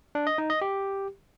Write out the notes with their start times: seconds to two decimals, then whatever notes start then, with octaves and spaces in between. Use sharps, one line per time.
0.15 D4
0.27 D#5
0.38 D#4
0.50 D#5
0.61 G4